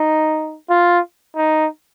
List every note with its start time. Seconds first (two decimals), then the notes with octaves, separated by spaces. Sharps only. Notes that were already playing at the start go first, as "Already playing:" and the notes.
Already playing: D#4
0.69 F4
1.36 D#4